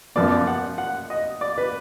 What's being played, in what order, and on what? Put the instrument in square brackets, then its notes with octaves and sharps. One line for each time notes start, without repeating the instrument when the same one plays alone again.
[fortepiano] F#2 F3 B3 D5
D5
F#5
F#5
D#5
D5
B4